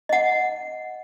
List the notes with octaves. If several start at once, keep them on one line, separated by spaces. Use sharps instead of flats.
D#5 F#5